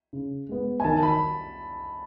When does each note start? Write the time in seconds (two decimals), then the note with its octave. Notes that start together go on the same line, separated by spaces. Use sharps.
0.13 C#3
0.49 G#3 B3
0.80 G#5
0.84 D#3 A5
1.03 B5